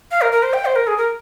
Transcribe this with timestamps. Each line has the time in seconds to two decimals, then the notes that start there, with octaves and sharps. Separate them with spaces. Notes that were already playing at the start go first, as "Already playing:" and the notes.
0.11 F5
0.21 A#4
0.32 A#4
0.43 C5
0.53 G5
0.65 C5
0.76 A#4
0.87 G#4
0.97 A#4